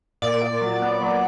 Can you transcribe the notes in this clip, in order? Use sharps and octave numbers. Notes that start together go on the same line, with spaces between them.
A#2 D5
A#2
F#3
B3
F#3